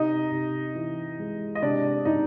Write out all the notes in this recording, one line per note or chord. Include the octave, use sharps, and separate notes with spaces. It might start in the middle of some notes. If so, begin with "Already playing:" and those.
Already playing: C3 D#4 D#5
C3
E3
G#3
D#5
C3 D4 D5
C3 D#4 D#5